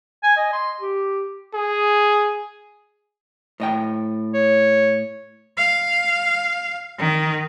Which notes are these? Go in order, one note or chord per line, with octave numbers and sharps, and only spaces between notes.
G#5
D#5
C6
G4
G#4
A2 D#5 G5
C#5
F5
D#3